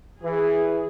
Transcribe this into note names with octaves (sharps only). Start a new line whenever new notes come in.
E3 G#4